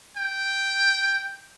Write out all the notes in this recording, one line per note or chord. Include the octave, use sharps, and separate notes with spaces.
G5